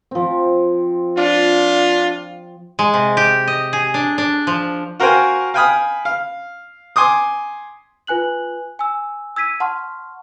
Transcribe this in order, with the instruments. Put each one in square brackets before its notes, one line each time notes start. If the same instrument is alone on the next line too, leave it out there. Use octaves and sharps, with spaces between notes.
[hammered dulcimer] F3 C4
[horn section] D4 F4
[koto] G#3
C3
G4
D#5
G#4
D4
D4
F3
[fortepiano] F#4 A#4 C5 F5 G5 G#5
F5 G5 G#5 B5 D#6 F6
F5
G#5 C6 D6 D#6
[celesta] F4 B4 G#5 F#6 F#7
G#5 E6
E6 G#6 B6 D#7
F#5 A5 C6 C#6 F6